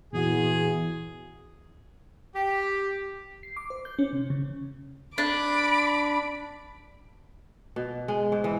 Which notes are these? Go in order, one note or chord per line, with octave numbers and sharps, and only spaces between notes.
E2 A#2 E3 F#4 G#4
G4
C7
D6
C5
G6
C#4
C3
C#3
D4 B5 D6
B2
G#3
G#2
E3